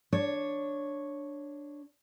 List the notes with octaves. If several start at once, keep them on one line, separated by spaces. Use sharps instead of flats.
D4 C#5